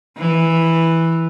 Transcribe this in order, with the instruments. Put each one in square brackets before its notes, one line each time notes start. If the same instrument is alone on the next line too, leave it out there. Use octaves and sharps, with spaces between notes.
[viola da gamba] E3